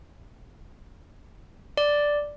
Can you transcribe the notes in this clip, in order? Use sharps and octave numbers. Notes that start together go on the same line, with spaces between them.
D5